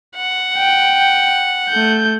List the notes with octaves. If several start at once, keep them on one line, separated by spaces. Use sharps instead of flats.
F#5
G5
A3 G6